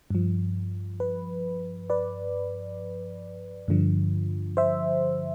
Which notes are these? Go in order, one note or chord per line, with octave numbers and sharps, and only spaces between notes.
G2 F3
B4
B4 D5
G2 D3 F3
C5 E5